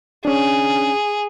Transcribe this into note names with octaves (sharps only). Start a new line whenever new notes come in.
C#4 D4 G#4